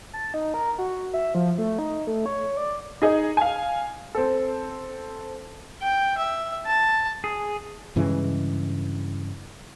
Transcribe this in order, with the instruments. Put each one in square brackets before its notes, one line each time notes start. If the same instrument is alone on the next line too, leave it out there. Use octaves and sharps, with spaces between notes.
[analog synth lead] A5
D#4
A#4
F#4
E5
F3
A3
D#4
A3
C#5
D5
[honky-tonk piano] D#4 G#4 D#5
F5 G#5
C4 A4
[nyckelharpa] G5
E5
A5
[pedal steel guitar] G#4
[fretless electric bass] G2 C#3 E3 G#3